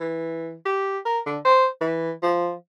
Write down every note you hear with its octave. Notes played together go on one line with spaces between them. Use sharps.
E3
G4
A#4
D3
C5
E3
F3